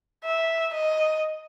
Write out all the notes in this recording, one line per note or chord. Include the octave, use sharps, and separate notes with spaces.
E5
D#5